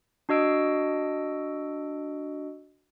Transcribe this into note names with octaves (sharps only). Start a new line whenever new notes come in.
D4 F#4 D#5 E6 D7